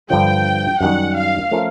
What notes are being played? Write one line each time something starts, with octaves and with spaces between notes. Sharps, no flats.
G2 D3 F3 G5
F#2 D#3 G3 F#5
F5
F3 A3 C#4 F4 A#4